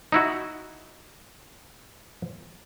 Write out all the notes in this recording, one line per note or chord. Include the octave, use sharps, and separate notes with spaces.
D#4 E4 F#4